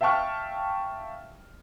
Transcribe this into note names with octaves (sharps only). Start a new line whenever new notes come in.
E5 F5 G5 A5 C#6 F6